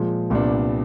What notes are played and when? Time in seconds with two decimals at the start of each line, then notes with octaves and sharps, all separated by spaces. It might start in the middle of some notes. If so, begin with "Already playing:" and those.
Already playing: A#2 F3 G#3
0.30 C2 A#2 G3 B3 D4